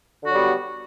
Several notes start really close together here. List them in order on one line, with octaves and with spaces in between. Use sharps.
D3 F#4 F#3 G3 B3